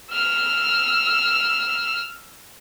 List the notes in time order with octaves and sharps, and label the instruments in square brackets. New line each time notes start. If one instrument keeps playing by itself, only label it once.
[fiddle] E6 F6